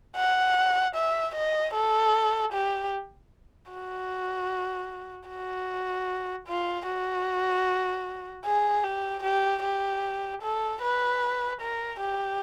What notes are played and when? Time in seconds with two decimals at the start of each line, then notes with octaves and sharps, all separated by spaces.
0.16 F#5
0.95 E5
1.35 D#5
1.74 A4
2.53 G4
3.71 F#4
5.29 F#4
6.48 F4
6.87 F#4
8.45 G#4
8.84 G4
9.23 G4
9.63 G4
10.42 A4
10.82 B4
11.61 A#4
12.00 G4